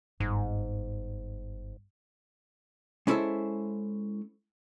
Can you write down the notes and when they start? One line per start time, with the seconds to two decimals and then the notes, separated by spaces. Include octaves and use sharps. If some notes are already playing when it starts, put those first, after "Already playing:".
0.20 G1 G#2
3.07 G#3 C#4 E4 A4 C5 E5